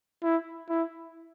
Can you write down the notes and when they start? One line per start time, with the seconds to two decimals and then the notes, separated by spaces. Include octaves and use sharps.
0.23 E4
0.69 E4